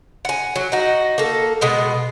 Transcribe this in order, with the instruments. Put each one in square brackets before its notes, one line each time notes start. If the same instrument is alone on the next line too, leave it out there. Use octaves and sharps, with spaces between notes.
[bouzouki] F#5 G#5
F#3
D#4 F#4
A#3 A4
B2 G#3 B3